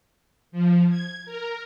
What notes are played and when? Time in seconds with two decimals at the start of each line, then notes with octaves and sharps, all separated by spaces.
0.52 F3
0.89 G#6
1.25 A#4